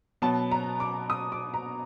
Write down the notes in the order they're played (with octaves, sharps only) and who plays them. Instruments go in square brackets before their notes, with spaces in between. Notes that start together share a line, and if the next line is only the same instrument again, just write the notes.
[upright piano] B2 F#3 B3 A5
A#5
D6
D#6
D6
A#5